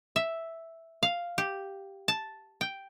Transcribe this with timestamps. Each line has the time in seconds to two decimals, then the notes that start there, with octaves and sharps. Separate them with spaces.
0.16 E5
1.03 F5
1.38 G4
2.08 A5
2.61 G5